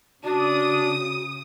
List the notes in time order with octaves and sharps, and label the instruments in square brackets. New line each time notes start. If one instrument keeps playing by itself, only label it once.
[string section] C#3 D#6 [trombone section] D4 [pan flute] F#4